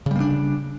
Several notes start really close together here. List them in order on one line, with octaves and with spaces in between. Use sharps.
C#3 G3 A#3 D4